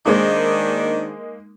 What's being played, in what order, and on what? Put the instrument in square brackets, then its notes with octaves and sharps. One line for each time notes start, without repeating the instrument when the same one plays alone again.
[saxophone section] D#3 D4 [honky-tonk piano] G#3 A#3 D#4 [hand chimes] C5 D#5 D6